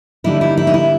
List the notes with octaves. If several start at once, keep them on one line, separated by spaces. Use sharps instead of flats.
D3 G3 A#3 D#4 E4
E4
E4
D#4
E4